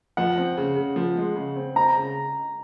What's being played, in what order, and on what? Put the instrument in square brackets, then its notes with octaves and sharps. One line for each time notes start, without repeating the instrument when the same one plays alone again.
[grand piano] F3 [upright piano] F#5
[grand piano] C4
C#3
C#3
F3
G#3
C#3
C4
[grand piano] C4 [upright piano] A#5
[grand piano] C#3